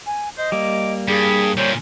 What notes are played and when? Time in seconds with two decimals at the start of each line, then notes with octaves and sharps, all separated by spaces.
0.06 G#5
0.38 C5 D#5
0.52 G3 A#3 D6
1.08 G2 G#4 B5
1.57 A#2 D3 C5 C#5